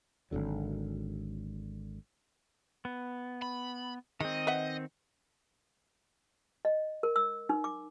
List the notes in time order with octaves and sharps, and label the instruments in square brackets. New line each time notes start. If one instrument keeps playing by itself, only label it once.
[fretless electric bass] G#1 D2 D3 F#3
[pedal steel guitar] B3
[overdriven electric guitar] B5
[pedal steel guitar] D#3 C4 [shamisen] G#3 [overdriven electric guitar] D#5
[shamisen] B4 E5 F#5
[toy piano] D#5
A#4
E6
D#4
D6